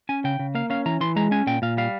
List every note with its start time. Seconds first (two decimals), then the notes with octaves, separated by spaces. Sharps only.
0.09 C#4 G#5
0.24 C#3 G5
0.39 C#3
0.55 A#3 F5
0.70 C#4 F5
0.86 E3 A#5
1.01 E3 C6
1.16 G#3 A#5
1.31 C#4 G#5
1.47 A#2 G5
1.62 A#2 F5
1.77 G3 F5